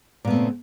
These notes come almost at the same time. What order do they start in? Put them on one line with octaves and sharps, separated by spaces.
A#2 B3 A3 C4 C#3